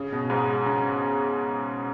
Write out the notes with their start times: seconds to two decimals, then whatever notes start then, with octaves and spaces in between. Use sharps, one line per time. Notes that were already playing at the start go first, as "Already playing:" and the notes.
Already playing: C#3
0.12 B2
0.30 G#2
0.66 C#3